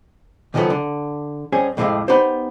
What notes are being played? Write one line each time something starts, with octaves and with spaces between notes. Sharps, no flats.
C#2 D#3 F3 F#3 A3 B3
D3
G2 C4 C#4 G#4
F2 A2 C3 G#3 E4 F5
B3 D#4 G4 C5